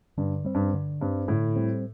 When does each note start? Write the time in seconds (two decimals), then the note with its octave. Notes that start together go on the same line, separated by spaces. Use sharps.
0.17 G2 D3
0.45 G3 C4
0.54 G2
0.74 D3
1.01 G2 G3 C4
1.28 A2 D3
1.56 G3 C4